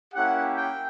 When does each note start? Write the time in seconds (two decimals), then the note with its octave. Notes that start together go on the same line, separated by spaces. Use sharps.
0.14 A#3 C#4 E4 G4 F#5
0.56 G5